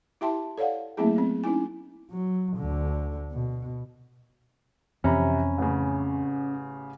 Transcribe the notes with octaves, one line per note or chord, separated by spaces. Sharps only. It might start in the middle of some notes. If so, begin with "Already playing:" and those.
E4 G4 E5 G5 A5 C6
A4 C#5 D5 F5 F#5
F#3 A3 A#3 C4 E4 G#4
B3 C4
C#4 D#4 E4 G#5
F#3
D2 D3
B2
F2 C3 E3 C4 C#4 A#5 B5
A1 C#3